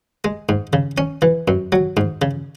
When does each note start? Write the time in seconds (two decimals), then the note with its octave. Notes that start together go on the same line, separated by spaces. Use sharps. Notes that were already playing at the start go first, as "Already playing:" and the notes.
0.25 G#3
0.49 G#2
0.73 C#3
0.98 C#4
1.22 E3
1.48 F#2
1.72 F#3
1.97 G#2
2.22 C#3